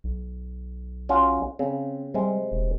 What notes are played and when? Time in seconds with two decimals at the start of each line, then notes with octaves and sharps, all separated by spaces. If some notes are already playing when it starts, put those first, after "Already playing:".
0.04 B1
1.09 C#4 F4 F#4
1.59 C#3 C4
2.14 C3 G3 G#3
2.52 E1